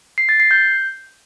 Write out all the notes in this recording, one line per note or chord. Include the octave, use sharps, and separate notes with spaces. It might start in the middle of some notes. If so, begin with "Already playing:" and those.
C7
A6
C7
G6